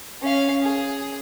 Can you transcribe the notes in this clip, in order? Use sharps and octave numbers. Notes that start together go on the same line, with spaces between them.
C#4 F5
G#4